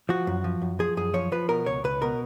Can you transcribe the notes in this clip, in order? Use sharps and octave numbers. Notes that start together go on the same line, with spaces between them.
F3 F#4
F#2
F3
F#2
F3 G#4
F#2 G#4
F3 C#5
F3 B4
B2 A#4
C#2 C#5
C#2 B4
B2 A#4